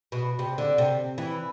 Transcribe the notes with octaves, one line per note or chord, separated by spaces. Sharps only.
B2
C3
D3
C3
E3